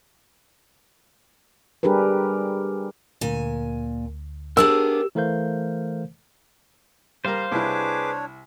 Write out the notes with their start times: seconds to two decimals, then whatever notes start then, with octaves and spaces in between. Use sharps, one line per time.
1.83 G3 D4 G4 G#4 A#4 B4
3.21 D2 A#2 G#5
4.57 B3 D4 G4 G#4 A#4 E6
5.15 E3 A3 A#4 C5 F5 G6
7.25 G3 A#4 C5 F5
7.52 C2 D4 E4 G#4 B4 C#5 D6